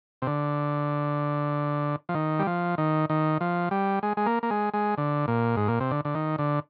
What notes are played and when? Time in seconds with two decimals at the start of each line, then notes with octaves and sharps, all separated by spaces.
0.22 C3
0.27 D3
2.09 F3
2.15 D#3
2.39 G3
2.47 F3
2.78 D#3
3.10 D#3
3.41 F3
3.71 G3
4.03 G#3
4.17 G#3
4.26 A#3
4.43 A#3
4.50 G#3
4.73 G#3
4.98 D3
5.28 A#2
5.57 G#2
5.68 A#2
5.80 C3
5.91 D3
6.05 D3
6.15 D#3
6.38 D3